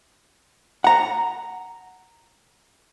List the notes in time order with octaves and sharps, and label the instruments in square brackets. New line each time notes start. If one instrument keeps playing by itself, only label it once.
[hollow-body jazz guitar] F#5 A#5